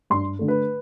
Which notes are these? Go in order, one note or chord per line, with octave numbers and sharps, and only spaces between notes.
G2 C6
D3 A3
B4